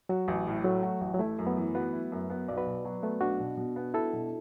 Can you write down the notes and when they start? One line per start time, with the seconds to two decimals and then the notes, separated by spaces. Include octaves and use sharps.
0.09 F#3 F#4
0.28 A1
0.47 A2
0.65 F#3 A3
0.83 F#4
1.01 A1
1.14 F#3
1.19 A3 E4
1.38 F#2
1.47 F#3 B3
1.57 E3
1.75 B3 F#4 B4
1.93 E4
2.12 F#2
2.30 B3
2.48 B1 D5
2.57 F#4 B4
2.67 B2
2.85 F#3
3.03 A3 B3
3.21 B1 D4 F#4
3.40 B2
3.57 B2
3.76 B3
3.94 E4 F#4 A4
4.13 B2